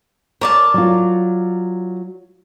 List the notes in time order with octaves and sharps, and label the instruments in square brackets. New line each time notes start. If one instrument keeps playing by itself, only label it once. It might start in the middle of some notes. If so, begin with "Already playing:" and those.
[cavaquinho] A#4 D5 A5 [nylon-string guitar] C#5
[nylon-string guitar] F#3 F4